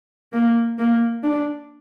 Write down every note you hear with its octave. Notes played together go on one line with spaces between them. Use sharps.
A#3
A#3
D4